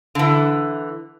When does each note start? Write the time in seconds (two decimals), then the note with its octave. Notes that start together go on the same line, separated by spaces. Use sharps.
0.15 D3 E3